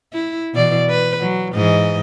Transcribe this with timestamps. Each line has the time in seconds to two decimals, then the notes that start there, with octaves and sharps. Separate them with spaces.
0.13 E4
0.54 B2 E3 D5
0.89 B4
1.20 F#3
1.54 G#2 E3 D#5